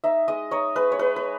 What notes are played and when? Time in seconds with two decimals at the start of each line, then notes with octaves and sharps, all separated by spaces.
0.04 D#4 E5
0.28 G#3 D#5
0.51 D#4 C#5
0.76 G#3 B4
0.92 C#5
0.99 G#3 B4
1.16 B4